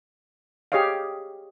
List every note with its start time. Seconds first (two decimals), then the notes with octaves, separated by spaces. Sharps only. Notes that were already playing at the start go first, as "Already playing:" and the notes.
0.72 G4 G#4 C#5 D#5 F5